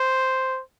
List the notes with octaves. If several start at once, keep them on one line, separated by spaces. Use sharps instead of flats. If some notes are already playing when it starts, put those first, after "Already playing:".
Already playing: C5